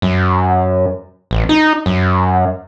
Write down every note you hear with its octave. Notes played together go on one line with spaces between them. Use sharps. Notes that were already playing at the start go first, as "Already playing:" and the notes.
F#2
A1
D#4
F#2